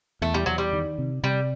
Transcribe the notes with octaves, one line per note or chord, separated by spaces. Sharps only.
E2 A3
G3
E2 F#3
G3
D#3
C3
C3 G3